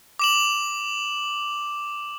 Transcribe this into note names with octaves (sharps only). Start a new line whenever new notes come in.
D6 E7 F#7